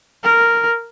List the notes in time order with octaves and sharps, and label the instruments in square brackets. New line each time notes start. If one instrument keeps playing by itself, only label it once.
[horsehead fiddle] A#4